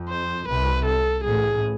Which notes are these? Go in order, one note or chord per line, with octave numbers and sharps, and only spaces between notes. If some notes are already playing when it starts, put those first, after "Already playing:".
Already playing: F2
C5
C2 C3 B4
A4
A1 A2 G#4